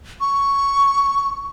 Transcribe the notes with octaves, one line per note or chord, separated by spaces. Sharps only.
C#6